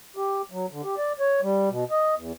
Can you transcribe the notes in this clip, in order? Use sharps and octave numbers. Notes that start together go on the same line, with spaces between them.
G4
F#3
D3
G4
D5
C#5
G3
B2
D#5
E2